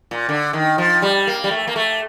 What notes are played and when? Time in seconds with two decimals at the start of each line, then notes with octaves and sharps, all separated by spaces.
0.11 A#2
0.29 D3
0.53 D#3
0.78 F3
1.02 G3
1.27 A#3
1.44 G3
1.51 A3
1.67 A#3
1.76 A3